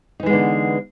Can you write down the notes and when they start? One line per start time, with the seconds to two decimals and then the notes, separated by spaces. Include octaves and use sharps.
0.20 D#4
0.23 E3
0.26 G#3
0.30 B3
0.33 D3